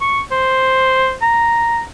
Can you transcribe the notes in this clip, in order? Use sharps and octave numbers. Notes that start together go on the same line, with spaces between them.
C#6
C5
A#5